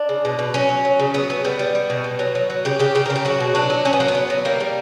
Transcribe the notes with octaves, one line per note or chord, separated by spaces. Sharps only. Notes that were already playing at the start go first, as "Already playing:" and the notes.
Already playing: D4
C#3
B2
B2
F#3 C#4
F#3
F#3
C#3
F#3 B3
F#3 B3
G3 B3
G3
G3
B2
B2
F#3
F#3
F#3
C#3 G4
C#3 G4
C#3 G4
A#4
C#3
G4
F#3 F#4
B2
F#3 D4
F#3
F#3 C#4
B3
F#3 A#3
B3
F#3
F#3
G3 A#3
G3